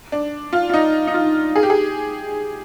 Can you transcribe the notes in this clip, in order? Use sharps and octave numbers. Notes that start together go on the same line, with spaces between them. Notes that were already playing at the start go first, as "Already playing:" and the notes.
D4
F4
F4
D#4
D#4
F4
G#4
G4
G#4